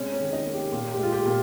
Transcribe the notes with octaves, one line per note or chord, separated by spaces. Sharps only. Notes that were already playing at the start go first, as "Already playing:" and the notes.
Already playing: C3 G#3 C#4 C#5
C#4 C#5
D#3
D#4 D#5
A#3
G4
A#2 G4
G4
G#3 F4
G4
A#2